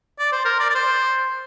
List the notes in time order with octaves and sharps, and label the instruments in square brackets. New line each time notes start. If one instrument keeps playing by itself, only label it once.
[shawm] D5
C5
A#4
D5
D5
C5